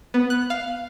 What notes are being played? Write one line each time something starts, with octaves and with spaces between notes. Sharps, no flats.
B3
F#6
F5